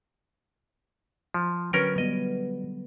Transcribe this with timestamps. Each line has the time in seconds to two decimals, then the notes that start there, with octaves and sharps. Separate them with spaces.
1.34 F3
1.73 D3 F#3 C#4 A#4 B4 G5
1.98 G3 B3 D#5